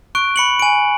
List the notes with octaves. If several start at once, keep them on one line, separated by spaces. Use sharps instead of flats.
C#6 F#6 D7
B5 C#7 F#7
G#5 D7